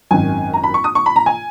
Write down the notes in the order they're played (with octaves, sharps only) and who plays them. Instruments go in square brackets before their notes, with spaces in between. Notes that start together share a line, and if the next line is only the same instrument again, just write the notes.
[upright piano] G#1 F#2 D#3 G#5
A#5
B5
C#6
D#6
C#6
B5
A#5
G#5